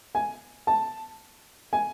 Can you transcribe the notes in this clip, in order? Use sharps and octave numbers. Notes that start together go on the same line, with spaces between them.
G#5
A5
G#5